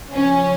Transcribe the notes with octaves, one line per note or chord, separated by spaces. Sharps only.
C#3 F3 C#4